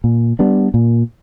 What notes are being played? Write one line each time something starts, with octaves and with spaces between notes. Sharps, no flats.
A#2
G3 B3 D4
A#2